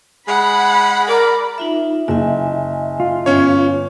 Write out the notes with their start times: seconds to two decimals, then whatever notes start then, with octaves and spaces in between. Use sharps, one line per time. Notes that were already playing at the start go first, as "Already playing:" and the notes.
0.28 G#3 F#5 B5
1.08 A#4 D5
1.58 D#4 F4 E5
2.08 F#1 D#5 E5 G#5
3.00 F4
3.26 G1 C#4 C#5